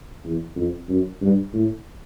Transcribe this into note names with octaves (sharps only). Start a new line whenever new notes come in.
E2
F2
F#2
G2
A2